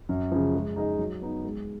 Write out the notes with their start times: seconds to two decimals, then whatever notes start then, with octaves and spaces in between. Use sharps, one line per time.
0.09 F#2
0.31 C#3 F3
0.54 G#3
0.76 D#4 G#4 D#5
0.99 F#3
1.22 B3 D#4
1.43 G#3